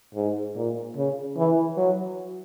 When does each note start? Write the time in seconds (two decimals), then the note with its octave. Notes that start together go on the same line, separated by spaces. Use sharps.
0.14 G#2
0.55 A#2
0.96 C#3
1.37 E3
1.77 F#3